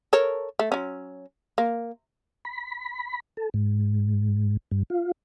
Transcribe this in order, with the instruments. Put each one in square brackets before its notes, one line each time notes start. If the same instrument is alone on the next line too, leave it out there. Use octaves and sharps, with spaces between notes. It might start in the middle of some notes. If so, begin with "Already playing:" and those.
[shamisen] A4 A#4 C#5
A3
F#3 C#4
A#3
[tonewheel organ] B5
A4
G#2
G2
F4